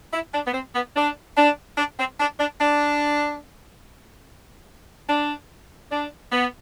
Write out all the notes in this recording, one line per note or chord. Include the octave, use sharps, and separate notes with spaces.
E4
D4
B3
C4
B3
D4
D4
D4
C4
D4
D4
D4
D4
D4
B3